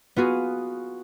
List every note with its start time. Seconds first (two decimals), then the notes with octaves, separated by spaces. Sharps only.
0.16 B3 F4 F#4 G#4